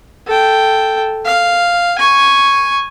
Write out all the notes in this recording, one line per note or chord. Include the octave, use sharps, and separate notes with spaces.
A4 G5
F5
G#5 C#6